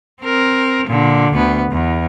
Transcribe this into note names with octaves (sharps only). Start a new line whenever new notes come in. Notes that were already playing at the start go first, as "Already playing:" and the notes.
C4 A#4
A#2 D3
D2 B3
E2